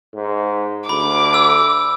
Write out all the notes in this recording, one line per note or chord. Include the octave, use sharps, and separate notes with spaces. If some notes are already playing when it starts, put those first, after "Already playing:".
G#2
D2 B5 D6
E6